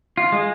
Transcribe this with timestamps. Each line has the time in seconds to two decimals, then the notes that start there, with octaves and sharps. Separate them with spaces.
0.17 F4
0.32 G#3